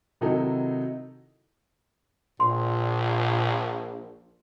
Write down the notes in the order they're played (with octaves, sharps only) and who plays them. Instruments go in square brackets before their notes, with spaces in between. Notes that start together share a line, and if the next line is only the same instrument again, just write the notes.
[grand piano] C3 D#3 F#3 D#4 E4 A4
[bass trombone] A#1 [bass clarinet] A#2 [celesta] C6